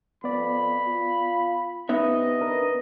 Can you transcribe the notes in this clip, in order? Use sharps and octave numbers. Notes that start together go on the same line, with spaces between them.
F2 B3 D5 B5
F4
C3 B3 D#4 B4 D#5 E5
D4 A#4 B4